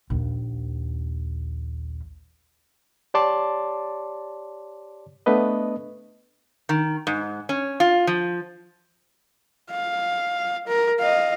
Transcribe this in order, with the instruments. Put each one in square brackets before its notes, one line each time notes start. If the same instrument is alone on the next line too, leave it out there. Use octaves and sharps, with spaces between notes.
[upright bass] A#1 D#2
[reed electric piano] G4 C#5 D5 A5 C6 D6
A3 B3 D4 B4 D#5
[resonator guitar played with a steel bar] D#3
G#2
C#4
F4
F3
[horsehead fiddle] F5
A#4
D#5 F5